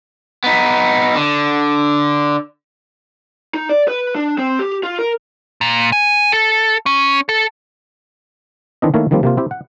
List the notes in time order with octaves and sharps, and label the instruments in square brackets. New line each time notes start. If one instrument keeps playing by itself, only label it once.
[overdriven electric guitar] B3 D#4
D3
[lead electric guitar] D#4
D5
B4
D4
C4
G4
F4
A#4
A#2
G#5
A4
C#4
A4
[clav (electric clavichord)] D#3 E3 C4 D4 E4 D#5
D#3 A3 A#3 E4 A#4 C#5
D#3 F3 G3 A#3 C4
C3 A#3 F4
C4 E4 G4
F#5